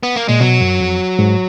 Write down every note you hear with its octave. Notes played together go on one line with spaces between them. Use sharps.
B3
A#3
A#2 G#3
B2 F#3
F#2
F2
G#2